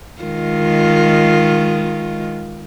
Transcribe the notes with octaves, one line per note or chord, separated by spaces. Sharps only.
D#3 G#3 F4